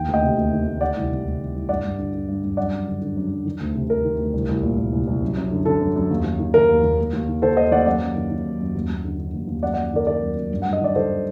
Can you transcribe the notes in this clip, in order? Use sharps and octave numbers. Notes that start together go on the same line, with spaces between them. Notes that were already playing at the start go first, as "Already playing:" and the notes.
Already playing: D#2 D#3 G5
D2
D#5 G5
C3
D2
D#3
D2
D#3 D5 F#5
C2
C3
C2
D#3
C2
G2 D5 F#5
G2
D3
D3
G2
G2
F#2 D5 F#5
F#2
D3
D3
F#2
F#2
D#3
D2
C3
D2 A#4
D#3
D2
C2
C2
A#2
A#2
C2
C2
F#2
F#2
D3
D3 A4
F#2
F#2
D#2
D#2
D#3
D#3 A#4
D#2
D#2
D#2
D#2
D#3
D#3 A4 C5
D#2 C5 D#5
D#2 D5 F#5
F#2 D5 F#5
F#2
D#3
D#3
F#2
F#2
D#2
D#2
D3
D3
D#2
D#2
F#2 D5 F#5
D5 F#5
F#2
D#3 A#4 D5
D#3 A#4 D5
F#2
F#2
G2
G2 F#5
D#5
D#3 D5
D#3 A4 C5